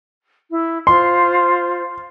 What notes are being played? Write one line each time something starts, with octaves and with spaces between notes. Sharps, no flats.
E4
F4 C5 C6